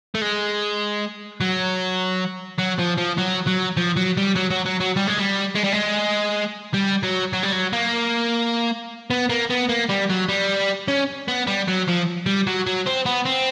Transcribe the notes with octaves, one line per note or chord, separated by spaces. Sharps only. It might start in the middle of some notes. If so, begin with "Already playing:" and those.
A3
G#3
F#3
F#3
F3
F3
F#3
F#3
F3
F#3
G3
F#3
F#3
F#3
F#3
G3
G#3
G3
G#3
G3
G#3
G3
F#3
F#3
G3
F#3
A#3
B3
A#3
B3
A#3
G3
F#3
G3
C#4
B3
G3
F#3
F3
G3
F#3
F#3
C4
B3
C4